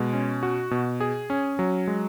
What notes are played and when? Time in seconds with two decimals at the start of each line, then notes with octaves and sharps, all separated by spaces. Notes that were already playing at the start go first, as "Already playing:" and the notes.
Already playing: B2 G#3
0.13 C#4
0.43 F#4
0.71 B2
1.00 G#4
1.30 C#4
1.59 F#3
1.88 G#3